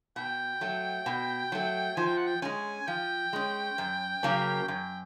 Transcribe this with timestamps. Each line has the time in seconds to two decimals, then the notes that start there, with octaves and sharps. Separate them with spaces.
0.16 B2 G5
0.61 F#3 A3
1.06 B2
1.52 F#3 A3
1.97 F3 G#5
2.06 G5
2.17 F#5
2.27 G5
2.42 G#3 C#4 G#5
2.87 F3 G5
3.33 G#3 C#4
3.78 F#2
4.23 C#3 F#3 A#3 C#4
4.68 F#2 G5